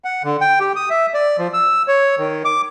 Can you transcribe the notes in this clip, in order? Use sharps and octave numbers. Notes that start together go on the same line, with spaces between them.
F#5
D3
G5
G4
D#6
E5
D5
F3
E6
C#5
D#3
D6